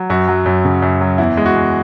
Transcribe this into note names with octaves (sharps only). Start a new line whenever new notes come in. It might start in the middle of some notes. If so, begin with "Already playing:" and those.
Already playing: F#3
F#2 F#4
F#3
F#2
C#3
F#2
F#3
E2 E4
G#3
F#4
E2